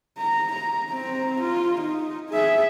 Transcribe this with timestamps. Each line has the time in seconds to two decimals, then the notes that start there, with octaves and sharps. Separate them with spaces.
0.18 A#5
0.53 A#5
0.91 C4 A#5
1.41 F4
1.81 D#4
2.30 G#4 E5